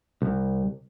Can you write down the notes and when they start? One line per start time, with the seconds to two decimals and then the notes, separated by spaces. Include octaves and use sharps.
0.22 C2